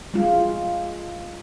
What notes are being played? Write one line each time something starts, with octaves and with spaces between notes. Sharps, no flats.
G#3 F4